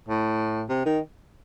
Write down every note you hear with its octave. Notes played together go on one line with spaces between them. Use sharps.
A2
C3
D#3